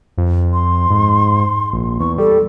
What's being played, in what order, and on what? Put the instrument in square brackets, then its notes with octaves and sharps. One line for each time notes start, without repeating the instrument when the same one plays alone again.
[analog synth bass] F2
[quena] C6
[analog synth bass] G#2
A#1
[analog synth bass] E2 [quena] C#6
[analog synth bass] G3 [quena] A4